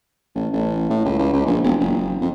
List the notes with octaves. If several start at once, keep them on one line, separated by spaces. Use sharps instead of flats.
A1
A1
A2
C#2
C#2
C#2
A#1
E1
F#1
F2